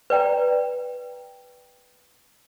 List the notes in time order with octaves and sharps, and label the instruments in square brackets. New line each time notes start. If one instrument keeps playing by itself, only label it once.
[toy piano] B4 D5 G5 A#5